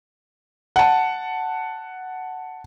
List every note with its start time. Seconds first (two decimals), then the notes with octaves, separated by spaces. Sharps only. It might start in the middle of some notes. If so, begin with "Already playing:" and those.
0.76 F#5 A5